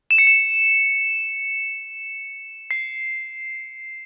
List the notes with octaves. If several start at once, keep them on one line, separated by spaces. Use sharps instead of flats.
E7
C#7
E7
C7